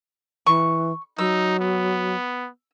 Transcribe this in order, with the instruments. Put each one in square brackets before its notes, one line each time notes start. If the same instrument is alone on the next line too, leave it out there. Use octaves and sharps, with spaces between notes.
[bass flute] E3 [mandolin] C#6
[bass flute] F#3 [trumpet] D#4 [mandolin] E6
[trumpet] B3